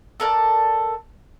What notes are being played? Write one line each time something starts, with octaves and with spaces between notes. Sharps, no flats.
A4 A#4 D5